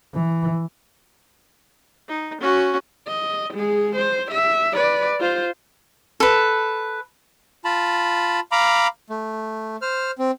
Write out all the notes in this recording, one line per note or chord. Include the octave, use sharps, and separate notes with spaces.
E3
D#4
C#4 F#4
D#5
G#3 G#4
C5
E5
B4 D5
F4 C5
A4 B4
F4 A5 B5
F5 A#5 B5 D6
A3
C5 F6
C4